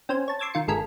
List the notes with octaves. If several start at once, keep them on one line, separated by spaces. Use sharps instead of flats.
C4 C#4 C5 G#5
C#5 A5
C6 D6 E6 G#6 A6
D#3 F4 C#7
G1 G#3 A4 A#4 G#5 B6